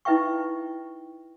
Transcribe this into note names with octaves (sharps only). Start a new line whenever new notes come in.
D#4 E4 B4 E5 G5 C#6